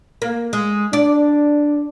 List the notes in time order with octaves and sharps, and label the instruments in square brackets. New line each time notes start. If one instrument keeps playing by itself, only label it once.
[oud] A#3
G#3
[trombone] D4 [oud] D5